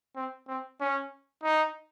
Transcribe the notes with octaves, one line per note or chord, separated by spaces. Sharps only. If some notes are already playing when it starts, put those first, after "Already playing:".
C4
C4
C#4
D#4